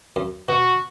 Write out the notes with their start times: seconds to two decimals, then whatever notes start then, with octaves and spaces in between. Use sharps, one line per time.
0.16 F#2
0.49 B2 F#4